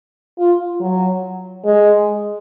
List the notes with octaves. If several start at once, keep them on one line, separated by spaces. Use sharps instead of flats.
F4
F#3
G#3